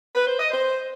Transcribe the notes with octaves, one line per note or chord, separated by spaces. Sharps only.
B4
C5
D#5
C5